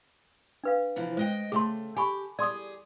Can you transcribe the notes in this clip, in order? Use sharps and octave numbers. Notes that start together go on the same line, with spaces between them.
D4 B4 F5
C3 E3 F3
G#3 C5 D#5 G5
C#3 A3 G#4 C6
G4 G#5 B5 C#6
G4 G#4 D5 C6 D#6